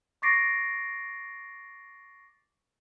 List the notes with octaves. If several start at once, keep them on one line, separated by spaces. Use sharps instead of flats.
C#6 D6 A6 A#6 C7 D7